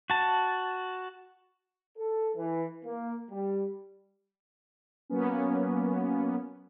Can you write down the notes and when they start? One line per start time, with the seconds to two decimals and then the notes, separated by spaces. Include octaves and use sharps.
0.10 F#4 A5
1.97 A4
2.35 E3
2.83 A#3
3.30 G3
5.10 F#3 A#3 B3 C#4